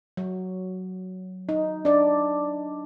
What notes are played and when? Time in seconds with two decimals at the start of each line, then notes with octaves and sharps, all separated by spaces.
0.17 F#3
1.49 D#4
1.85 D4 D5